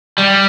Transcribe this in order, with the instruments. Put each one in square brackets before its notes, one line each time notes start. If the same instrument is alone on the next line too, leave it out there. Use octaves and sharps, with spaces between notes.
[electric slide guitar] G3